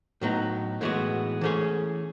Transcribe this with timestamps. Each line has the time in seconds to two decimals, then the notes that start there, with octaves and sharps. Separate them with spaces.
0.21 A2 F#3 B3 D#4
0.81 A2 E3 G#3 B3 F#4
1.41 E3 A3 C#4 G#4 C#5